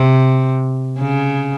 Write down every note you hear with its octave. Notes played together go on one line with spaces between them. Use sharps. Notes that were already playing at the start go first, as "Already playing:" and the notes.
Already playing: C3
C#3